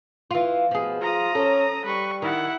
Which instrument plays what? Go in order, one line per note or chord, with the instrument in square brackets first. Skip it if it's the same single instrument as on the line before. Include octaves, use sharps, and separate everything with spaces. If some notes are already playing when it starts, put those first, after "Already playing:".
[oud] E3 F4
[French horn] B2 [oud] F3 G#4
[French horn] F4 [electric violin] A#5 D#6
[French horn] C#4 [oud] A4
[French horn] G3 [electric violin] B4 C#6
[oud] D#3 [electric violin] E4 F#5